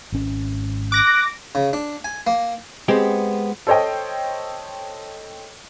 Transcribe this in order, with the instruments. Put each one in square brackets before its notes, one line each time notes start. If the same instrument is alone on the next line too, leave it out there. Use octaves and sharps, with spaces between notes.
[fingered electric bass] G#1 C#4
[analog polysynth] D6 A#6 [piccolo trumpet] F#6
[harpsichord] C#3
D4
G#5
A#3
[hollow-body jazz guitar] G#3 B3 C4 G4 G5
[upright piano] A4 C5 C#5 D#5 G5